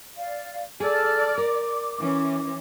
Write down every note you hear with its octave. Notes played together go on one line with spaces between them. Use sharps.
D5 F5
G#4 A4 D5 F6
A#4 D6
E3 C#4